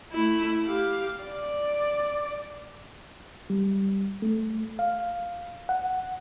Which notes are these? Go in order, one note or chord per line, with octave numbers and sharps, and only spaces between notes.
A3 E4
G4 F5
D5
G3
A3
F5
F#5